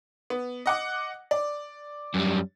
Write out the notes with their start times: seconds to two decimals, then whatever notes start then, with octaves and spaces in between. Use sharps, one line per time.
0.30 B3
0.66 D#5 F#5 D6
1.31 D5
2.15 F#2 G3